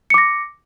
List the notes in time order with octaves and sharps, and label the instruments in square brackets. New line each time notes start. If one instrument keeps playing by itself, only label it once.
[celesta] C#7
D6
A#6